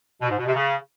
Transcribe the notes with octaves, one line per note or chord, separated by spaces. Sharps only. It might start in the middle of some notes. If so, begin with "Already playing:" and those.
B2
G#2
B2
C3
C#3